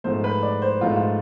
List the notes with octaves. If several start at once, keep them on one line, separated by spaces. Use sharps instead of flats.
G#2 F3 A3 C5
B4
D5
C5
G#2 F3 A3 F4
F4